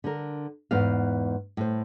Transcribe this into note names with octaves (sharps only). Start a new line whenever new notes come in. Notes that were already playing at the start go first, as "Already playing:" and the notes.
D3 A#4
E2 G#2 B3 F5
A2 C5